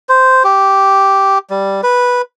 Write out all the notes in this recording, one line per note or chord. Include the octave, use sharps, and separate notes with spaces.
C5
G4
G3
B4